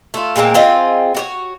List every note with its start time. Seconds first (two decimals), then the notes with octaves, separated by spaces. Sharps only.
0.14 A3 F4
0.36 A#2 G#3 A#3 C4
0.54 C4 F4 G#4 D#5
1.15 F#4 G4 C#5